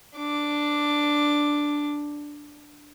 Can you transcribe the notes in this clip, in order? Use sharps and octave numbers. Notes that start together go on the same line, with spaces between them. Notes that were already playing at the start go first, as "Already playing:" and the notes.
D4 D6